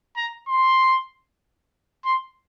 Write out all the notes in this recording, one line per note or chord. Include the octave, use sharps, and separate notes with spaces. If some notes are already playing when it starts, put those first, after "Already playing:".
A#5
C6
C6